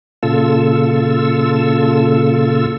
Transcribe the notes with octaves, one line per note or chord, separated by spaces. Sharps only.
A#2 C#3 F4 A4 E6